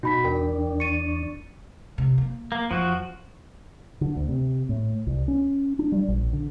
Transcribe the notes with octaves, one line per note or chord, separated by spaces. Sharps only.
B2 D#4 F#4 B5 B6
E2 D4 A#4 G5
C#6 A6 C#7 D#7
C3
A#3
A#3
F2 F3 F#4
D3
D2
C3
A2
C2
C#4
D4
G3
A#1
D3